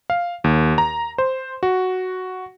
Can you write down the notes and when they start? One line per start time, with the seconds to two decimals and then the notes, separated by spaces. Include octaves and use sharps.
0.10 F5
0.44 D#2
0.78 A#5
1.18 C5
1.63 F#4